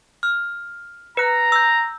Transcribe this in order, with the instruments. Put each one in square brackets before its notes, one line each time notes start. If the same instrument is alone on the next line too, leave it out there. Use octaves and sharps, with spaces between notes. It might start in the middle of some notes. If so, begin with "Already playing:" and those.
[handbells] F6
[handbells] B4 F#6 [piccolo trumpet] A#5
[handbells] E6 G6